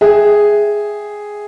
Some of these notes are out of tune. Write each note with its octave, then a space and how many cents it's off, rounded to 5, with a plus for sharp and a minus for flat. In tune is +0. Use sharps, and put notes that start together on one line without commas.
G#4 +0 E5 +0 G5 +0